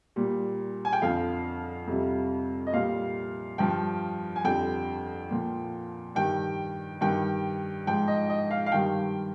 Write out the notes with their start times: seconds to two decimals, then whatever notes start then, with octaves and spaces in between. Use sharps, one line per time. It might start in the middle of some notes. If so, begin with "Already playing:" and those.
0.16 A#2 G3
0.85 G#5
0.93 G5
1.02 F2 D3 F3 F5
1.87 F2 C3 G3
2.67 D#5
2.73 A#2 G3 F5
3.58 G2 F3 G5
4.36 G#5
4.44 F2 D3 G3 G5
5.30 A#2 F3
6.15 G2 D#3 G3 G5
7.01 G2 D#3 G3 G5
7.87 G#2 F3 G5
8.08 D#5
8.30 D#5
8.51 F5
8.66 F5
8.72 G2 D#3 G3 G5